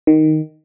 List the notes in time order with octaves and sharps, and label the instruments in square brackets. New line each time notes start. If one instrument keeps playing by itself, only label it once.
[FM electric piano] D#3